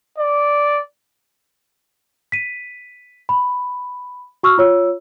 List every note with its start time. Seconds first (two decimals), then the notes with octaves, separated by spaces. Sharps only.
0.18 D5
2.32 B6 D#7
3.29 B5
4.43 F#4 C#6 E6 F6
4.58 F4 C#5 E6